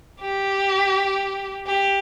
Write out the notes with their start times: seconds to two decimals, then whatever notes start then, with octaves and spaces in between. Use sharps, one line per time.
0.21 G4
1.67 G4